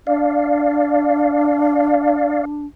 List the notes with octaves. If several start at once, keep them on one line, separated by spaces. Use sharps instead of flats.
D4 D5 F5